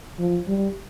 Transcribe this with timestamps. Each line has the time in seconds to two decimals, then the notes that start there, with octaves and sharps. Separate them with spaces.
0.19 F3
0.48 G3